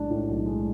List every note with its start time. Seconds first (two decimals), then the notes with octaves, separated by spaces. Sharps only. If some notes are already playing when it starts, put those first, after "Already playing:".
Already playing: B1 A2 G#3 D4
0.10 A2
0.28 B1
0.46 G#3